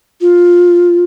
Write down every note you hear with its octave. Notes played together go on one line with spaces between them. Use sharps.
F4